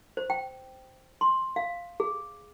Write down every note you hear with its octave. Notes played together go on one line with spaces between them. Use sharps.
C5
G5
C6
F5
G#4